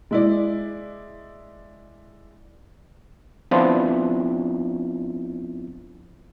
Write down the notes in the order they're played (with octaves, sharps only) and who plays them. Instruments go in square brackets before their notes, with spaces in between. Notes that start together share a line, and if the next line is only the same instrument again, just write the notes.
[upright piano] G#3 E4 D5
[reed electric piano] F3 B3 C4 D4 E4 F4